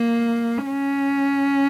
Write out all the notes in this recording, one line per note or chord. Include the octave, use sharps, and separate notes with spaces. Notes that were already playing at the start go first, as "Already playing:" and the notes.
Already playing: A#3
C#4